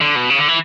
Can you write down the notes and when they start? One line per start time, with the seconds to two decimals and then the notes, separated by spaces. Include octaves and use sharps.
0.01 D3
0.16 B2
0.30 C#3
0.38 D3
0.48 E3